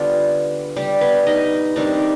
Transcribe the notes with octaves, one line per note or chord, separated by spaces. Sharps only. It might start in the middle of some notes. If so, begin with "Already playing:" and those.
Already playing: D3 G3 B3 D4 F4
G3 G4
B3 B4
D#4 D#5
D#3 G3 C4 D4 D#4 D5